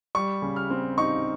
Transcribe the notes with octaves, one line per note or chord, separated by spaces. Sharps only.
G3 C#6
C#3
F6
C4
D#4 C#6